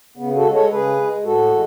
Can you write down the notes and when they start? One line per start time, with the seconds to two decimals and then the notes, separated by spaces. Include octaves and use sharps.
0.17 C#3 B3
0.35 F#4 A4
0.44 G#3
0.53 A4 C#5
0.71 C#3 G#4 B4
0.97 G#3
1.24 A2 F#4 A4
1.50 E3 G#3